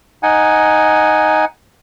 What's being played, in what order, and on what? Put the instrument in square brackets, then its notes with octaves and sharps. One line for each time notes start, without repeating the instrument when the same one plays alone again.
[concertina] D#4 F#5 G#5